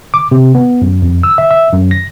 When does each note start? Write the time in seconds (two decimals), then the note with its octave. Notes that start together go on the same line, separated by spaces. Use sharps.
0.14 D6
0.32 C3
0.55 B3
0.82 F#2
1.02 F2
1.23 E6
1.38 E5
1.51 E5
1.72 F#2
1.91 A#6